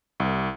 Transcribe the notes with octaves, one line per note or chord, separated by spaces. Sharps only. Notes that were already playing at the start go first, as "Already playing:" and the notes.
C2